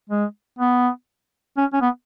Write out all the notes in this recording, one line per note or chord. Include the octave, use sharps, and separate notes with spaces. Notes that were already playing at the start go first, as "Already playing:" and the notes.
G#3
B3
C#4
C#4
B3